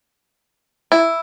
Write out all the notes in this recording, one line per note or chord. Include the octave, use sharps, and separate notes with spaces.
E4